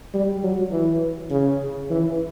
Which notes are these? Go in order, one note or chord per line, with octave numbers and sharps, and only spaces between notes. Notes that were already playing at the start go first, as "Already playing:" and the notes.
G3
F#3
E3
C#3
E3